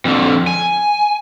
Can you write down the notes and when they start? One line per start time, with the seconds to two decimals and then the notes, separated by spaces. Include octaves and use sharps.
0.05 F2 D3
0.47 G#5